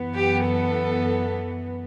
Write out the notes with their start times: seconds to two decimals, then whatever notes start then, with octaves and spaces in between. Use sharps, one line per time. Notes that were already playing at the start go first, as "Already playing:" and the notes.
Already playing: F#2 E3 B3
0.15 G4
0.47 A4